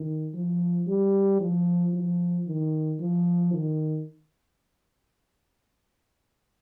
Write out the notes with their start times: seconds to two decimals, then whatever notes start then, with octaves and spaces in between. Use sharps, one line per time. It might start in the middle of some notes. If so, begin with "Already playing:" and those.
Already playing: D#3
0.34 F3
0.87 G3
1.40 F3
1.94 F3
2.47 D#3
3.00 F3
3.53 D#3